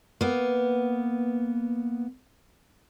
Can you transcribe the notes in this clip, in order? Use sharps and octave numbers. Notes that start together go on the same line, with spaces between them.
A#3 B3